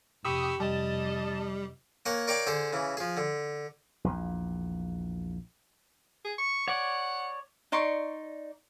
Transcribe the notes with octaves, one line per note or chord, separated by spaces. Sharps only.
F1 G4 B5 C#6 D#6 E6
F1 G3 D#5 A5
A#3 C#5 F#5 G#5
A#4 C#5 D5 F5 G5 D6
D3 G#4 C5
C#3 E3
F3 G#4
D3
A#1 E2
G#4
C#6
C#5 D5 F#5
D#4 D5 C6 C#6